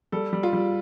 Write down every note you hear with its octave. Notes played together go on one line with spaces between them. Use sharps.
G3 A4
G3
F4
G3